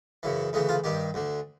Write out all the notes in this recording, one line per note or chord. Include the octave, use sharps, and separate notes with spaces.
F#2 C#3 E3
D2 C#3 E3 D#4
F4
G2 D#3 G4
D2 D3